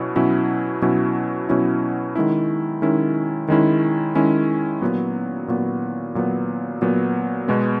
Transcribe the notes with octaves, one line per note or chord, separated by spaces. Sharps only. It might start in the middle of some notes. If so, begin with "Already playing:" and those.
Already playing: B2 F#3 C#4 E4
B2 F#3 C#4 E4
B2 F#3 C#4 E4
B2 F#3 C#4 E4
D#3 G#3 C#4 E4
D#3 G#3 C#4 E4
D#3 G#3 C#4 E4
D#3 G#3 C#4 E4
A#2 F#3 B3
A#2 F#3 B3
A#2 F#3 B3
A#2 F#3 B3
B2 G#3 B3